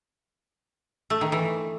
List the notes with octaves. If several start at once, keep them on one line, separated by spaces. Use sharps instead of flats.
A3
D#3
E3